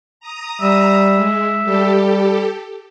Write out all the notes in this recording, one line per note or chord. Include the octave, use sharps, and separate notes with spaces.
A#5 D#6
G3 E5
G#3
G3 G4 A4